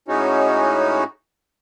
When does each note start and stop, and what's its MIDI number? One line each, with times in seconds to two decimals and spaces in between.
0.08 1.04 45
0.08 1.04 56
0.08 1.04 61
0.08 1.04 63
0.08 1.04 66